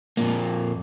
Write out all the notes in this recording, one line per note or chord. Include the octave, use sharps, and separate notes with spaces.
F2 A#2 A#3